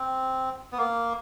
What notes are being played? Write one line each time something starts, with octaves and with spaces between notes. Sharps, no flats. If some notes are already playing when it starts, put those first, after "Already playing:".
Already playing: C4
B3
A#3